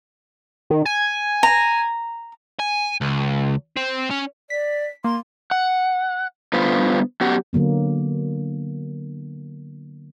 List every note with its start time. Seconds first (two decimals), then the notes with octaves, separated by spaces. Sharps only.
0.70 D#3
0.85 G#5
1.43 A#5
2.59 G#5
3.01 C#2
3.76 C4
4.10 C#4
4.50 D5 B6
5.04 A#3 C6
5.51 F#5
6.53 D3 G3 B3 F4 B4 C5
7.21 F#3 B3 C#4 G4 F#5
7.53 D3 F#3 A#3 B3